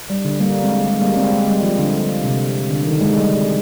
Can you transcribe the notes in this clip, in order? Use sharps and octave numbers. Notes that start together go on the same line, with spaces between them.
G3
D3
G3 A#3
G#3 C4
G#3
G3 A#3
G#3 C4
G#3
G3
F3
D3
C3
D3
D#3
G#3
G3